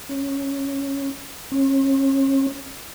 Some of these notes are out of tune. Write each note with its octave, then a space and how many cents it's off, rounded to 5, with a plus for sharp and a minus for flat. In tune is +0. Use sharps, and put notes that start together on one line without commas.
C#4 -5
C#4 -35